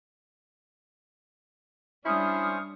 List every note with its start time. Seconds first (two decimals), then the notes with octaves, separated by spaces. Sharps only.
2.05 G3 C#4 D4 E4 C5 C#6 D#6 F6